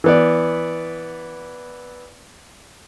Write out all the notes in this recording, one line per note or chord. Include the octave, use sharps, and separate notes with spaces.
E3 B3 D5